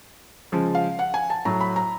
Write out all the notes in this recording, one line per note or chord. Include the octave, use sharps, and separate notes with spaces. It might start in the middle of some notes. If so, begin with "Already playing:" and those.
C#3 F3 G#3
F5
F#5
G#5
A5
A2 F#3 A#5
B5
A#5